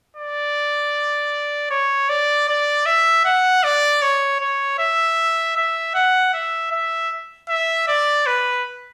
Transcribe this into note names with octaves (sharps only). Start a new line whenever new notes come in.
D5
C#5
D5
D5
E5
F#5
D5
C#5
C#5
E5
E5
F#5
E5
E5
E5
D5
B4